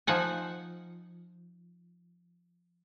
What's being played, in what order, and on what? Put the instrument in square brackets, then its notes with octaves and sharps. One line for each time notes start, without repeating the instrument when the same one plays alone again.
[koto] F3 D#4 F#5 G#5